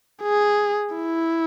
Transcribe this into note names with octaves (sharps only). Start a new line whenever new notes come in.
G#4
E4